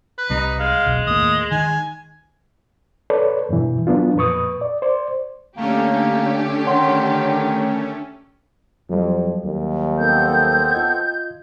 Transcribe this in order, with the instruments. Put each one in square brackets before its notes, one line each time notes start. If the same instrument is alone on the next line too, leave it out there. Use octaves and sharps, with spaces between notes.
[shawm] B4
[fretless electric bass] C2 C3 G3 [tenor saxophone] D#4
[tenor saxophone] G#3 [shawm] F5
[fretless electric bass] E1 B1
[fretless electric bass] D#2 A2 A#3 [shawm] D#6
[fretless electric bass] D#3 [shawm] G#5
[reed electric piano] A4 B4 C#5 D5
E2 G2 B2 E3
E3 F#3 B3 D4 F4
F2 A#2 B4 C#6 D#6
D5
C5 D5
[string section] D3 G4 [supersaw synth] A3 C#4 [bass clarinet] A#3
[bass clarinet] D#3 [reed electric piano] C#5 F#5 C6
[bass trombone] F2 [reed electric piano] F#3 G3
[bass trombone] D#2
[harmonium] B3 C4 A4 [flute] G6
[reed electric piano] F4 D#5 G#6